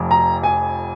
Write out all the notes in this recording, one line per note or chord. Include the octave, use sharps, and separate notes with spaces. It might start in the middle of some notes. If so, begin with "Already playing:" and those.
Already playing: F1 F2 F3
A#5
G#5